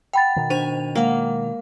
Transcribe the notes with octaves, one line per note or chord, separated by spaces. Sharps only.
F#5 G5 B5 A6
B2 D#3
D4 C5 G#5 F7
G#3 A#3 F#5